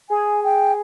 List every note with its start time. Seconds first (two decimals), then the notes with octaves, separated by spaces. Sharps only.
0.10 G#4 G#5
0.44 G5